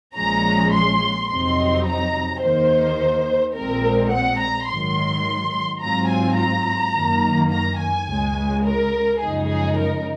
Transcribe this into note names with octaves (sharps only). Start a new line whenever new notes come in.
A#1 A#2 F3 G#3 C#4 A#5
C6
F2 C3 F#3 C4 D#4 C6
A#5
D#2 D#3 A#3 D#4 C5
A#1 A#2 G#3 C4 A#4
F#5
A#5
G#2 D#3 F#3 C6
G#2 F#3 C4 F4 A#5
G#5
A#5
F#2 D#3 A#3
A#5
G#5
C#2 C#3 G#3
A#4
F#2 C#3 F3 G#3 D#4 G#4
G#4
A#4